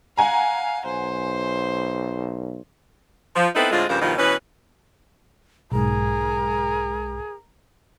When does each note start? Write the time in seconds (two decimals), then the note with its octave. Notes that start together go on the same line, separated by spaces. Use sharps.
0.17 F5 F#5 G#5 A#5
0.85 B1 C5
3.36 F3
3.55 B3 C4 D#4 E4 A4 B4
3.71 A2 D3 G#3 C4 F4
3.89 G2 C#3 F3 A#3 C5 F5
4.02 G2 B2 D#3 F3 D#4 F4
4.18 B2 E3 C#4 B4
5.72 B1 G#2 G#4 A#4